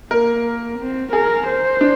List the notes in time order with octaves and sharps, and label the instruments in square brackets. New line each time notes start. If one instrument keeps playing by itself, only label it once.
[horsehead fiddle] A#3 [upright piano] A#4
[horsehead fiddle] C4
[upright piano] G#4 [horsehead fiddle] A#4
[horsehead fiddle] C5
[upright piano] D4